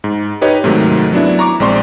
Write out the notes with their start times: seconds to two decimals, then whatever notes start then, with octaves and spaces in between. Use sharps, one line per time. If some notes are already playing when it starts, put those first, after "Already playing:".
0.04 G#2
0.41 D#4 G4 B4 C#5 D#5
0.64 G#2 C3 D#3 F#3 A3
1.13 F#3 B3 D4 E4
1.39 A#5 C#6 D6
1.60 A#1 G#3 C4 D5 C6 C#6